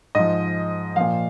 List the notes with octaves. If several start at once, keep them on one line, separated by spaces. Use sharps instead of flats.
G#2 F3 D#5
A#2 F3 F5